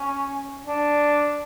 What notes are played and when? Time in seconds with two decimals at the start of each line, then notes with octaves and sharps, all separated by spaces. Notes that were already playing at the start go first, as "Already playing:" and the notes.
Already playing: C#4
0.67 D4